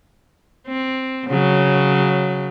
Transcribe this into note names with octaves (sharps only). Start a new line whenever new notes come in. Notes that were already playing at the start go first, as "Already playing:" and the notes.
C4
C#3 F#3